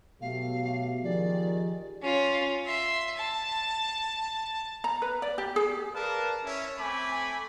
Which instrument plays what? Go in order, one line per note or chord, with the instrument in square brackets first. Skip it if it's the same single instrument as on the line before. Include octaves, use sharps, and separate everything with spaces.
[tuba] B2 [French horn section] F#3 A3 G4 [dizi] F5
[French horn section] D#3 G4 G#4 [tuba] F3 [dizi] D5
[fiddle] C#4 F4
E5 C6
A5
[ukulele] A#5
B4
D5
G4
G#4
[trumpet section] A#4 B4 D5 F5 A5
C#4 E4
A3 C4 G#5 B5 D6